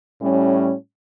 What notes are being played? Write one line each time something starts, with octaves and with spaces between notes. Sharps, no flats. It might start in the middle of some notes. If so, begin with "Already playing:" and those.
A2 G3 C#4